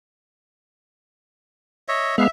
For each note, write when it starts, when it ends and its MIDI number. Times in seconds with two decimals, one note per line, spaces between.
1.88 2.16 73
1.88 2.16 75
1.88 2.16 76
2.18 2.28 56
2.18 2.28 59
2.18 2.30 76
2.18 2.28 77